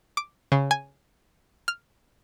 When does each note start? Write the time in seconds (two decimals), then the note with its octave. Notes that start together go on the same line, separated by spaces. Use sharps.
0.17 D6
0.52 C#3
0.71 G#5
1.68 F6